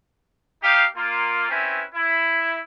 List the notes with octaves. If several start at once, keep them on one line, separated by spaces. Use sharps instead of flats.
D#4 G4 F5
A#3 F4
C4 C#4 E4 B4
E4